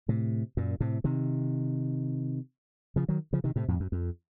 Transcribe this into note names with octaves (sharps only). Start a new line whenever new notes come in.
A2 C3
F#2 A#2
A2 C3
C3 D#3
C#3 F3
D#3 F#3
C#3 F3
C3 D#3
A2 C3
F2 A2
F#2
F2